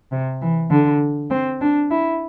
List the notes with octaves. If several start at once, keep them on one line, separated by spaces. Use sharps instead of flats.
C3
E3
D3
C4
D4
E4